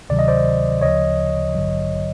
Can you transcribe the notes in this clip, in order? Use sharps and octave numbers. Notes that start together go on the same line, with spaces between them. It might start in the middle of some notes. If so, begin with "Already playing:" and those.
D2 C3 D#3 F#3 D5
D#5
C5 D5
D2 C#3 F3 C#5 D#5
A1 G2 D3 F#3